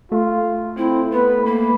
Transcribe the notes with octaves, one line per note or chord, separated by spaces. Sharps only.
A3 F4
C4 E4
B3 B4
A#3 B5